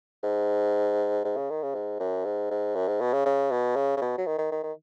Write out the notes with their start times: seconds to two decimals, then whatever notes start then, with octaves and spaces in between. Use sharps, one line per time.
0.23 G#2
1.24 G#2
1.36 C#3
1.50 D#3
1.63 C#3
1.74 G#2
2.00 F#2
2.25 G#2
2.50 G#2
2.75 F#2
2.88 G#2
3.01 B2
3.13 C#3
3.26 C#3
3.51 B2
3.76 C#3
3.97 C#3
4.02 B2
4.18 F#3
4.26 D#3
4.38 D#3
4.52 D#3
4.64 D#3